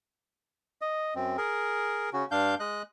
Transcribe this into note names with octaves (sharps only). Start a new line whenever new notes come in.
D#5
F#2 C4
G#4 A#4
C#3 C#4 F#4
G2 D4 F5 G6
G#3 D#5 F#6